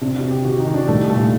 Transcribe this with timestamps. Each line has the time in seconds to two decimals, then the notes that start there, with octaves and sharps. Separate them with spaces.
0.01 C3 D4
0.16 F#4
0.24 C3
0.31 G4
0.45 D#3 F#4
0.60 D#4
0.67 D#3
0.74 D4
0.88 C2 A3
1.10 A#2 A3